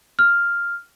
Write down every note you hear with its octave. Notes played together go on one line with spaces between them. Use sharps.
F6